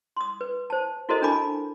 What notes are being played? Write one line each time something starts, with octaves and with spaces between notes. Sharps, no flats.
C6 D#6
B4
C5 A5
E4 F#4 A4 A#4 C5 D#5
D4 A#4 G#5 A5 B5 D6